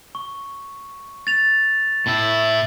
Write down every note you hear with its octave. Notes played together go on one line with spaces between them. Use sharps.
C#6
A6 F7
A2 E4